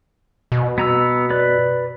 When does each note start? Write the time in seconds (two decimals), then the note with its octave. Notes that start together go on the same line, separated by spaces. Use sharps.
0.52 B2
0.78 B3 A#5 E6
1.30 B4 D5